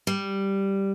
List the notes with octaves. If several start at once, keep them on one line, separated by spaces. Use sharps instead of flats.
G3